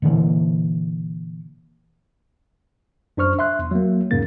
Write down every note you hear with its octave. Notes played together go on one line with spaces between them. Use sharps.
A#2 D3 E3 A#3
F#2 D4 C5 C#6 F6
E5 C6 F#6
E2
F#3 A#3
E2 G#2 C#3 A#3 A6